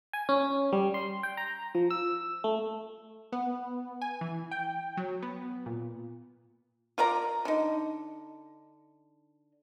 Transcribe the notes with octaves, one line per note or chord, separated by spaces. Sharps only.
G#5
C#4
G3
C6
G5
A#5
F3
E6
A3
B3
G#5
E3
G5
F#3
B3
A#2
F4 A#4 D5 A#5
D3 D#4